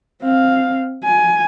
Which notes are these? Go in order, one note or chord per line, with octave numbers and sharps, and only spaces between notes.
C4 F5
G#5